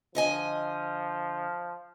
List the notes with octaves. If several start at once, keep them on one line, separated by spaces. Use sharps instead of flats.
D3 F3 D#5 G#5